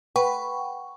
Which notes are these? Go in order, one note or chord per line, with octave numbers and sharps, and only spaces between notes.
B4 F#5 G5 C#6